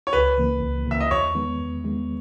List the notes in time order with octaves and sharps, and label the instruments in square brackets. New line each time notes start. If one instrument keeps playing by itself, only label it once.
[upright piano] C#5
[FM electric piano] C#2 [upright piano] B4
[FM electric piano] C#3 E3 A#3
C#2
[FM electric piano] C#3 E3 A#3 [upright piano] E5
[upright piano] D#5
[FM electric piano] E2 [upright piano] C#5
[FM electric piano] D#3 G#3 B3
E2
D#3 G#3 B3